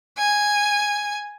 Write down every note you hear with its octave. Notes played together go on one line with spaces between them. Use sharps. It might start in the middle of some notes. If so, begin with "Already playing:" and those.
G#5